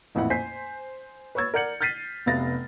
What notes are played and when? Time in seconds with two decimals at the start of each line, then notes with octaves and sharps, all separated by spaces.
0.15 A1 F2 A#2 E4 F#5
0.30 C5 G#5 G6 B6 C7
1.35 B4 C#5 C#6 E6 G#6 A6
1.54 A#4 D5 F#5 G6 C#7 F#7
1.81 F6 G6 A6 B6 C7 D#7
2.26 F1 C3 B3 F5 A6 A#6